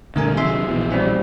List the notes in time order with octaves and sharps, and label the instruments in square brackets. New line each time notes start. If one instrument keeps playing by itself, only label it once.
[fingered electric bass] C2 A#2 D3 [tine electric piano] A3 A#4 G#5
[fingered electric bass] C3 D#3 F#3 [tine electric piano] G#4 E5 C6
[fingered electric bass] A#1 B2 E3
[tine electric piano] G3 C4 C#4